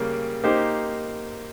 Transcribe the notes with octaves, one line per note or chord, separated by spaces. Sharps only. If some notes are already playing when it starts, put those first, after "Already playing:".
Already playing: C#3 G3 A#3
A#3 D#4 G4 C5